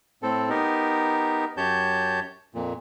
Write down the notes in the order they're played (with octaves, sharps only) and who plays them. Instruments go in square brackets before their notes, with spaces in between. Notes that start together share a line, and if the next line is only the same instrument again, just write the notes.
[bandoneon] A2 C4 A4
B3 D#4 G4 A#4
F#2 G4 C#5 A5 G6
F2 A#2